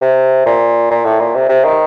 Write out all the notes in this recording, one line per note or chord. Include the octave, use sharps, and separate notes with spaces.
C3
A#2
A#2
A2
A#2
C3
C3
D#3